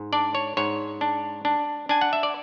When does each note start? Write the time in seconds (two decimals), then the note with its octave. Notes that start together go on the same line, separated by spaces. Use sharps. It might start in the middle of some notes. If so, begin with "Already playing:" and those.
Already playing: G#2
0.13 D4 D5
0.35 C#5
0.57 G#2 C#5
1.01 D4
1.45 D4
1.89 D4 G#5
2.01 F#5
2.13 E5
2.23 D5